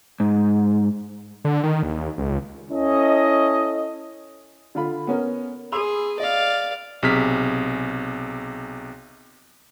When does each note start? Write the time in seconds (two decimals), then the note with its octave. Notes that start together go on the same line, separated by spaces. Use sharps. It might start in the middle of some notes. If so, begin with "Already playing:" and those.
0.20 G#2
1.45 D3
1.63 D#3
1.83 D#2
2.18 C#2
2.71 C#4 E4 A4 D#5
4.75 D3 F4 B5
5.07 B3 C#4 A#4
5.72 G#4 B5 C6 E6
6.20 D5 D#5 F5
7.03 B1 C3 G#4 F6 B6